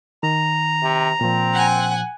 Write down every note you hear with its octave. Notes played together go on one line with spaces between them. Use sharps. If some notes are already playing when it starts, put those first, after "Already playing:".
D#3 A#5
C3
A#2 F3 C4
F#5 G#5